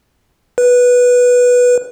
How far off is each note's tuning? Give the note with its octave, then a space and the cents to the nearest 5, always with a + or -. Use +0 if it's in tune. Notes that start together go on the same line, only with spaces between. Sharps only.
B4 -10